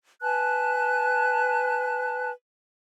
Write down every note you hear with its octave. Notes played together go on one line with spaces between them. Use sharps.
B4 G#5 A5 F#6